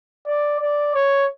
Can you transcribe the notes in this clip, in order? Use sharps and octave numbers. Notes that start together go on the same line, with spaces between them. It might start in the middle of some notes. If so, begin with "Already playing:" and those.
D5
D5
C#5